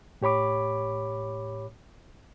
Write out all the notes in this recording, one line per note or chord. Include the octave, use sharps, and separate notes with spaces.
A2 G4 C#5 B5 D6